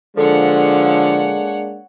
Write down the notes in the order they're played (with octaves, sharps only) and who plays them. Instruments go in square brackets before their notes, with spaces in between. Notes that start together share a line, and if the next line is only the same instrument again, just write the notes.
[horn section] D3 F3 [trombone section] G#3 A#3 D4 [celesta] A4 [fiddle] C#5 F#5